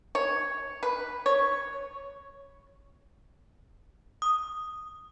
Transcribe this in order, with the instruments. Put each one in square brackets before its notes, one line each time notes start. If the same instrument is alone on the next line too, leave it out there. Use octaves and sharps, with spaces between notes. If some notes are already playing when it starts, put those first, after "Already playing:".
[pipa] C#5
B4
C#5
[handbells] D#6